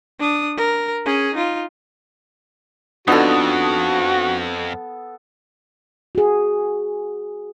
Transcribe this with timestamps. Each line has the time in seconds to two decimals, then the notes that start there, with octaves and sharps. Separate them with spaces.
0.20 D4 D#6
0.57 A#4
1.06 C#4 G#4
1.34 D#4 F4
3.08 F2 B3 D4 D#4 F4 F#4 A4
6.15 F#4 G#4